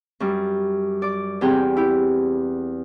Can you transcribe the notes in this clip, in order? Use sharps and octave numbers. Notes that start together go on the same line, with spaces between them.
F#2 G3
D5 D6
E2 C4 G4 G#4 G5
E4 G4